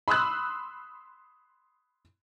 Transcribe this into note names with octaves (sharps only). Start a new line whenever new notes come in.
B5 C6 D#6 E6 F#6